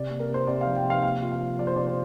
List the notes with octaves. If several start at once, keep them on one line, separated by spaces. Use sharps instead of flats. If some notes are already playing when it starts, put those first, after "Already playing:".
Already playing: C3 D5
A#3
A#4
C3 C5
C3 D5
F5
F3
G5
C3
F5
A#3 F5
F4
F5
F3
F3 D5
C5
C3 D5
C5